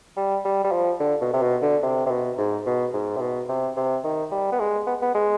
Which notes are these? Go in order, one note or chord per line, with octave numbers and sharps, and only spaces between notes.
G3
G3
G3
F3
D3
B2
C3
B2
D3
C3
C3
B2
G#2
B2
G#2
C3
B2
C3
C3
D#3
G3
B3
G#3
B3
B3
G#3